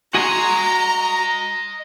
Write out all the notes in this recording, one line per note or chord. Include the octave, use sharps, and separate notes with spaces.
F#4 D#5 F#5 G#5 A#5 C6